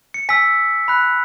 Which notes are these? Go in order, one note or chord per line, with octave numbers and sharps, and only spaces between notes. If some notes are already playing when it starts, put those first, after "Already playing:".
C#7
G#5 E6 B6
B5 F#6